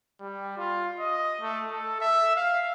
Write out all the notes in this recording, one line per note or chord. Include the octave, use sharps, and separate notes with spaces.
G3
F4
D#5
A3
A4
E5
F5